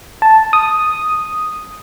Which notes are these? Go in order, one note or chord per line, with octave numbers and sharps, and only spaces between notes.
A5
D#6